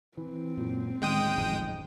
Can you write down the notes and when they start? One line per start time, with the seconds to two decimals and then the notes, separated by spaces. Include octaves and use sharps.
0.17 E3 C4
0.57 F#2 A#2 F#3
1.02 D1 D#3 G#3 C#4 G5 D#6
1.38 G#1 F2